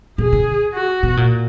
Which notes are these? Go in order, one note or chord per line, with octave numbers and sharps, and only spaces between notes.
B2 G#4
D3
F#4
B2
A#2